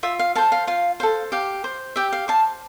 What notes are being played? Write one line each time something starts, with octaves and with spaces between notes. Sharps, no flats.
F4 E5
F5
A4 C5 F5 A5
F5
F4 F5
A4 C5 F5
G4 F5
C5
G4 E5 G5
F5
C5 F5 A5